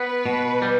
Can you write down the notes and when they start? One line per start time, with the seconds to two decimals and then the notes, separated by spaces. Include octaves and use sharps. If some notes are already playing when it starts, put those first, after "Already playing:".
Already playing: B3 B4
0.26 B2
0.62 G3